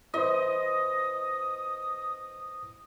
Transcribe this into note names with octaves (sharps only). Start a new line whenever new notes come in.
E4 B4 C5 D#5 D#6